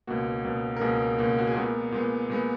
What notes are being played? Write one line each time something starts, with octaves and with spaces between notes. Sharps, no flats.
C#2 B2 A#3 F#4
C#2 B2 A#3
A#4
C#2 B2 A#3 G#4
C#2 B2 A#3
F#4
G#4
A#2 G#3 B3 A#4
A#2 G#3 B3
A#2 G#3 B3